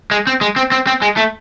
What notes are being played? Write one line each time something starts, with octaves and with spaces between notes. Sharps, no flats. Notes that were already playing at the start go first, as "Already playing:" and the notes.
G#3
C4
G#3
C4
C4
C4
G#3
A3